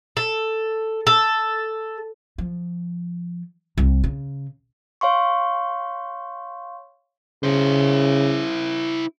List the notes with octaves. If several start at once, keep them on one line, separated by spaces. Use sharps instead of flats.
A4
A4
F3
C2
C#3
C#5 F5 C6 C#6
C#3 E4 C5